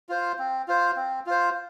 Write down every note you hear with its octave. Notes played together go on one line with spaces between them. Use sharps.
F4 C5
C4
F4 C5
C4
F4 C5